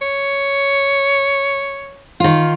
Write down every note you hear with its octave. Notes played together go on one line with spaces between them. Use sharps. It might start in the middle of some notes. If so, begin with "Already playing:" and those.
C#5
D#3 F4